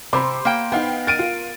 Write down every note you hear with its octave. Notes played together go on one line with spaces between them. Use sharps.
C3 C5 B5 C6 D6
A#3 G5
B3 D#4 F5 G5
A#4 A6 D7 D#7
F4